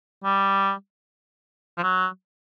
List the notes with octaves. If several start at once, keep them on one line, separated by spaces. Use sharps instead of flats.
G3
F3
F#3